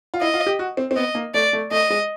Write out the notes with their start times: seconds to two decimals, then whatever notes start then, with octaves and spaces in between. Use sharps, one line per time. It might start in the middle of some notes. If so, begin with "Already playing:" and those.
0.14 F4
0.21 E4 D#5
0.34 F4
0.47 G4
0.59 F#4
0.77 C4
0.91 C4
0.96 B3 D#5
1.15 A#3
1.34 A3 D5
1.53 A3
1.71 A3 D#5
1.90 G#3